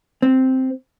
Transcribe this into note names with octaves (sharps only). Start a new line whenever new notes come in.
C4